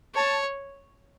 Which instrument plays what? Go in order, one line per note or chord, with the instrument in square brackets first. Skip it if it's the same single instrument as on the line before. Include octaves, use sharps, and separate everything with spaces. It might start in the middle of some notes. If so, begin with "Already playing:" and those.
[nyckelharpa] C#5 [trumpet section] A5